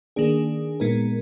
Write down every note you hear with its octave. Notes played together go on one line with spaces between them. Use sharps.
D#3 A#3 D4 G#4
A#2 G#3 B3 D#4 A#4